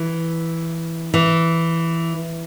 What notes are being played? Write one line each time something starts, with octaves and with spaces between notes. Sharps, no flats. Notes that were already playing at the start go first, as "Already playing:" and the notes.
Already playing: E3
E3